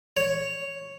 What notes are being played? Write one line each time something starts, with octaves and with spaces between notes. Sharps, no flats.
C#5